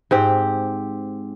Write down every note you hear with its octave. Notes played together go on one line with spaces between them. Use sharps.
G#2 C4 G4